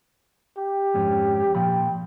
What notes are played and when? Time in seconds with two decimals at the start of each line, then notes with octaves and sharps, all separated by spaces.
0.58 G4
0.94 F2 G#2 C#4
1.55 A#2 F3 G5 B5